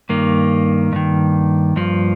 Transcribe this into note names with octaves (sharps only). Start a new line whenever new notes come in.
G2 D#3 A#3
G2 D#3
G2 F3